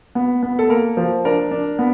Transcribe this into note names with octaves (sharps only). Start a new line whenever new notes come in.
B3
B3
A4
A#3 A#4
F3
D4 A#4
D4
B3